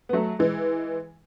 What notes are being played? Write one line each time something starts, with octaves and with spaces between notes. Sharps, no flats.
B3
F#3 A3
E3 G#3